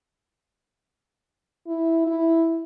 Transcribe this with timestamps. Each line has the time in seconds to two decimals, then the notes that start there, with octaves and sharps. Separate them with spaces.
1.67 E4
2.07 E4